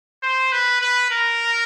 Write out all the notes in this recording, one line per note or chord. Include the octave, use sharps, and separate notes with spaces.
C5
B4
B4
A#4